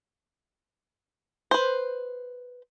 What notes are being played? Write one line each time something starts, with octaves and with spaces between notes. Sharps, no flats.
B4 C5